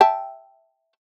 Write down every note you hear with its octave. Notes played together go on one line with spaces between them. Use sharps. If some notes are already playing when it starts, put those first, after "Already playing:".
E5 G5 A5